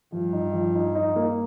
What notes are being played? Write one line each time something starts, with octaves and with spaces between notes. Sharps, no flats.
G2 F3
D#4
F3
D#4
D#4
A#3